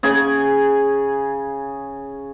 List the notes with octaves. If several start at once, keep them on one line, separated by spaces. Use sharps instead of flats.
C#3 G#4 G#5